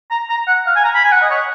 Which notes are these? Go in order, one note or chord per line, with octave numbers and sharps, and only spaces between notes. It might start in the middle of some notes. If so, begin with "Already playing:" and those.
A#5
A#5
F#5
F5
G#5
A#5
B5
G#5
F#5
D#5
C#5